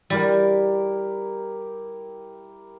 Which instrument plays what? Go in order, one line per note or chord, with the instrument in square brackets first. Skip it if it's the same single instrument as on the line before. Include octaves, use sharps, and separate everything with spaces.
[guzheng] G3 [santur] E4 G4 A#4